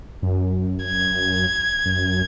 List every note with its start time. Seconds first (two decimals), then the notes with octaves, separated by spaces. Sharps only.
0.22 F#2
0.85 G#6
1.85 F#2